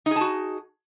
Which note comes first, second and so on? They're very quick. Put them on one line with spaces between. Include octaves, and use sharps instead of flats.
D#4 G#4 A5 F#4